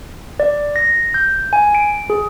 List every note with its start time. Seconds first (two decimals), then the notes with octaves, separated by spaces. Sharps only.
0.40 D5
0.76 A#6
1.14 G6
1.53 G#5
1.75 D7
2.10 G#4